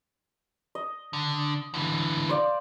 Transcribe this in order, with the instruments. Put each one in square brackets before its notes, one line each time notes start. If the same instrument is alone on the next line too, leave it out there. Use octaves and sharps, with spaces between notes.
[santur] D#5
[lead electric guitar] D3
D3 E3
[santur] C5 D5 F5